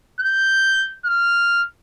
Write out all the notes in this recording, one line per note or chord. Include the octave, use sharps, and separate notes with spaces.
G6
F6